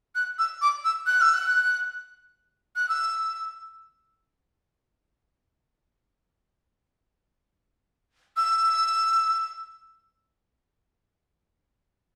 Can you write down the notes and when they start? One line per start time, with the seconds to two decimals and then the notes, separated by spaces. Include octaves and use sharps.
0.15 F#6
0.39 E6
0.62 D6
0.84 E6
1.07 F#6
1.21 E6
1.34 F#6
2.76 F#6
2.89 E6
8.37 E6